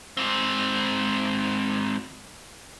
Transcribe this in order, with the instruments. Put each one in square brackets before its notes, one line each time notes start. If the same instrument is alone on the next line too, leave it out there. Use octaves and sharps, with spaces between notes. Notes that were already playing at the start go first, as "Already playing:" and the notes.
[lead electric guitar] G#2 C4